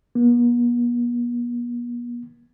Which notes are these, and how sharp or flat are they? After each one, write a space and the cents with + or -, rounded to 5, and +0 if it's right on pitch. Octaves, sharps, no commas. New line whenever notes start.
B3 -45